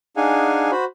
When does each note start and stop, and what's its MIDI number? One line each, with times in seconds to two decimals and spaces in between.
0.17 0.71 62
0.17 0.71 63
0.17 0.71 68
0.17 0.71 77
0.17 0.71 78
0.17 0.71 80
0.72 0.85 66
0.72 0.85 72
0.72 0.85 83